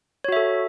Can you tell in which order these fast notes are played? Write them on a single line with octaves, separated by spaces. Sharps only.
C#5 F#4 E5 A4